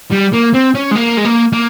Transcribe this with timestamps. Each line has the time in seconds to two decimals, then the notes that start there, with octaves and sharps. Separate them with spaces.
0.11 G3
0.33 A#3
0.54 C4
0.74 C#4
0.91 G#3
0.95 A#3
1.17 G#3
1.25 A#3
1.53 A#3